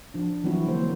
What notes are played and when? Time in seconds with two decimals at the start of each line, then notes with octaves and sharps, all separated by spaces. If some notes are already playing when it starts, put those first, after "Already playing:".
0.14 F3 D4
0.44 E3 F#3 G3 C4 E4 F#4
0.68 D3 A#3 C5